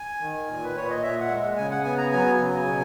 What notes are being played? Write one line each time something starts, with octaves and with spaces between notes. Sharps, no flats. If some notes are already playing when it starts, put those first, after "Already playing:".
Already playing: G#5
D#3
A#2
B4
A#2 C#5
D#5
A#2 E5
F#5
G#3
C#3 G#5
F#5
B3 G#5
A#5
F#3 G#5
C#3
B2